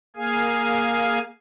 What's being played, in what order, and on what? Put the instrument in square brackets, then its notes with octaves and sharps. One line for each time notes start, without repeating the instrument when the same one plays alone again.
[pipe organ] A#3 G#4 F5 G#5